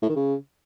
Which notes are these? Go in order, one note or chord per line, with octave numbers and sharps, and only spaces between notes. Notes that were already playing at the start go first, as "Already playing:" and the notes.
A2
D#3
C#3